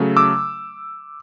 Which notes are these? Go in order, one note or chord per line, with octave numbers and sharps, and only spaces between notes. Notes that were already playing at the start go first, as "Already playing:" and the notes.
Already playing: C#3 F#3 A3
D6 E6